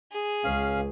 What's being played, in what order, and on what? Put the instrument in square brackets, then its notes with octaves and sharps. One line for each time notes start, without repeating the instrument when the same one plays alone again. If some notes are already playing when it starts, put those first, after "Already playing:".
[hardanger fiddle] G#4
[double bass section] C#2 [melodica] C#4 F5